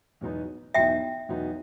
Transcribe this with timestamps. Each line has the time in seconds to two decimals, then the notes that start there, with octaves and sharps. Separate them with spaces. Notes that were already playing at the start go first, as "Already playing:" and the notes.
0.21 E2 B2 F#3 B3 D#4
0.74 E2 B2 F#3 B3 D#4 E5 G5
1.29 E2 B2 F#3 B3 D#4